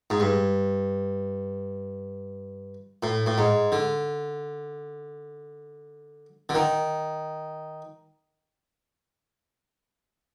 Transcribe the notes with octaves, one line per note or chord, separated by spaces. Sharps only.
G#2
G2
A2
A2
G#2
D3
D3
D#3